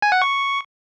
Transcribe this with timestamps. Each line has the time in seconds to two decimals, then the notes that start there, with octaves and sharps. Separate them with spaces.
0.02 G#5
0.12 F#5
0.22 C#6